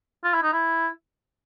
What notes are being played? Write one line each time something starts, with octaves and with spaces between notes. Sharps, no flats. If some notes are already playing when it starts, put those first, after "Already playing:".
F4
E4
D#4
E4